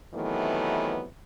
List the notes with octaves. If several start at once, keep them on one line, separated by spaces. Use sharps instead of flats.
C3 D#3 E3 F#3 A3 B3